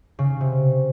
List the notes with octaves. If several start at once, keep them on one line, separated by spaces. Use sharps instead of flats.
C#3
C3